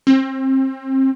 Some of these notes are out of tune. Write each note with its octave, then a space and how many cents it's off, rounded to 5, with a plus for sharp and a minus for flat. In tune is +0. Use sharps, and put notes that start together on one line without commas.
C4 +30